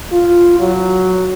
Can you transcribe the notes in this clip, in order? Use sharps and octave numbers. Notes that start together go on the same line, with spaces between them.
F4
F#3